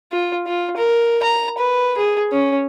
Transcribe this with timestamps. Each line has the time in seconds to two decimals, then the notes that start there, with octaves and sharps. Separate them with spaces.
0.12 F4
0.47 F4
0.77 A#4
1.23 A#5
1.58 B4
1.97 G#4
2.32 C#4